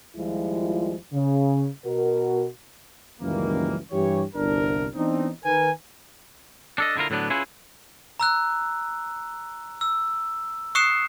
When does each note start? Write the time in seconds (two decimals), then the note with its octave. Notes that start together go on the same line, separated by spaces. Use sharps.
0.16 D#2 F3 G3 G#3 E4 F4
1.13 C#3
1.85 B2 F#4 A#4
3.21 C#2 F#2 D#3 E3 G3 A#3
3.92 G2 E3 G4 C#5
4.35 G1 C2 D4 A#4
4.95 E3 B3 C4 D4 D#4
5.44 D#3 A#4 B4 G#5
6.78 D4 A4 D#5
6.97 D3 E4 F4 A#4
7.10 A2 D3 F#3 B3 D4
7.30 C#4 E4 F4 G#4 B4
8.20 A#5 E6 F#6
9.81 E6
10.75 C#6 D#6 F#6 C7 C#7 E7